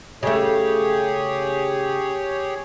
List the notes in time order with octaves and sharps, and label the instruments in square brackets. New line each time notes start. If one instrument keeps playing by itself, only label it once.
[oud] C#3 A3 [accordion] G4 G#4 C#5